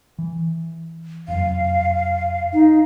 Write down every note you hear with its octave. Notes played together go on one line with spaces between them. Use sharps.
E3
F1 F#2 F5
D#4